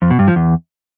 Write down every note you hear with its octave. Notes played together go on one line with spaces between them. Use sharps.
F2
B2
G2
F3
E2